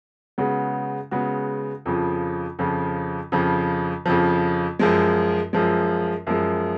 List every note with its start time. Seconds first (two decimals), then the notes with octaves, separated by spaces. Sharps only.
0.38 C#3 G#3 B3 F#4
1.11 C#3 G#3 B3 F#4
1.86 F2 C#3 F3
2.59 F2 C#3 F3
3.32 F2 C#3 F3
4.06 F2 C#3 F3
4.79 F#2 F3 G#3
5.53 F#2 F3 G#3
6.27 F#2 F3 G#3